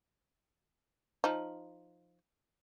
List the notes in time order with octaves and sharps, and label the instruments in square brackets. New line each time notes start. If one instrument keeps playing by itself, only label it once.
[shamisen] F3 D#4